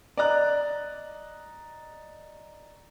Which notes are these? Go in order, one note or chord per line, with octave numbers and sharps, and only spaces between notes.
D5 D#5 A#5 F#6